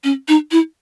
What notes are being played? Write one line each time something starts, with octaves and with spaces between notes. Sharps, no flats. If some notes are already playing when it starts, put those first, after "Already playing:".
C#4
D#4
E4